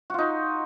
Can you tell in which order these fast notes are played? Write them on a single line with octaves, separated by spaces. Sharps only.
F#4 F4 D#4